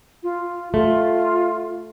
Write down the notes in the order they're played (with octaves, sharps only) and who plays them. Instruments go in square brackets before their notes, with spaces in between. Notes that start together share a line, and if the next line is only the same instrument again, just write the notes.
[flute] F4
[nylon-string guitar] A3 [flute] F4